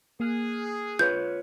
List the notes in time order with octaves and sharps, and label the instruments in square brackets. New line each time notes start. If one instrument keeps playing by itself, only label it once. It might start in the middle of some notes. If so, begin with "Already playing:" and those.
[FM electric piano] A#3 F6 F#6 [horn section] G#4
[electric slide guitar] F4 B4 C#5 [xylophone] G6